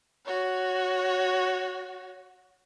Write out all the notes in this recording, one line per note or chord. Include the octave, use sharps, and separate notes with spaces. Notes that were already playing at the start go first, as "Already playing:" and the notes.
F#4 C#5